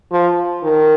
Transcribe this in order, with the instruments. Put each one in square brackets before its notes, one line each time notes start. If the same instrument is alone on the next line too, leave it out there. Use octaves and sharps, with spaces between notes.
[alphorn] F3
D#3